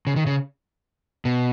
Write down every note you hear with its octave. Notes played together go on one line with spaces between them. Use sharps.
C#3
D#3
C#3
B2